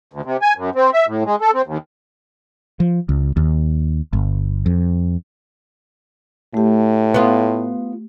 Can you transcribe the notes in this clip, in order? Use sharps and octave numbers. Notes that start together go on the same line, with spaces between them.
D2
C3
G#5
F#2
C4
E5
A2
G#3
A4
C4
D#2
F3
C#2
D#2
G1
F2
A2 A3 G4
B3 F4